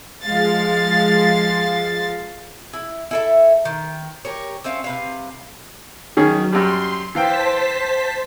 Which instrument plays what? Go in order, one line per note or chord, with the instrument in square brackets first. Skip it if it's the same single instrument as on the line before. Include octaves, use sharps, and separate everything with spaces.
[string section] F3 G#3 F5 A6
[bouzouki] E4
E4 A4 E5
D#3
G4 A#4 C#5
C4 C#4 E5 F5
C3 B4 F5
[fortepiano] D#3 C#4 G#4 [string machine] F#3
[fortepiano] F#2 G3 [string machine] C6
[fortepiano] E3 F5 G5 [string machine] C5 A5 B6